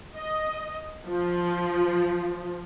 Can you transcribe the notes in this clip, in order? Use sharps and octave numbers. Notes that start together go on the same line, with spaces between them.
D#5
F3